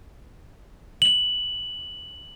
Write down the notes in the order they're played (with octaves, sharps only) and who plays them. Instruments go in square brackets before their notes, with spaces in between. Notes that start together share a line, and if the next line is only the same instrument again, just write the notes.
[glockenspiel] F#7